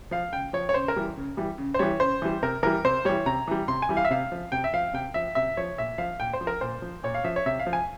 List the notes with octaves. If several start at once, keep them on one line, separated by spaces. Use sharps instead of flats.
F3 F5
C#3 G5
F3 C#5
C#5
C#3 C5
A#4
E3 G3
C#3
E3 G3
C#3
C5
E3 G3 C#5
C#3 C5
E3 G3
C3 A#4
E3 G3 A#4
C3 C5
E3 G3 C#5
C3 A#5
E3 G3
C3 C6
G#5
E3 G3
F5
E5
C3 F5
F3
C3 G5
E5
F3 F5
C3 G5
F3 E5
C3 E5
F3 C#5
A#2 E5
F3 F5
A#2 G5
C5
F3
A#4
A#2 C5
F3
A#2 C#5
F5
F3 E5
C#5
C3 E5
F5
F3
G#5